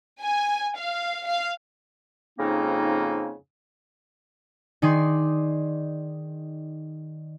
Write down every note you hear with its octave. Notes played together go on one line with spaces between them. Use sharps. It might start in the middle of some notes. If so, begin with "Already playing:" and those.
G#5
F5
F5
F2 G#2 C#3 A#3 C4 D#4
D#3 D#4 G#4 D5 C6